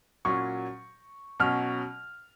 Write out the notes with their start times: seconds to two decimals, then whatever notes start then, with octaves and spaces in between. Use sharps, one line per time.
0.25 A#2 F#3 C#4 C#6
1.40 B2 F#3 C#4 F6